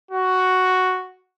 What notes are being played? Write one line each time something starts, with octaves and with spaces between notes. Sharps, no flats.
F#4